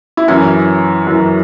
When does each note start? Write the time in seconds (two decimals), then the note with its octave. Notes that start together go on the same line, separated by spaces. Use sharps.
0.17 E4
0.28 F#2 E3 C#4
1.07 F#2 E3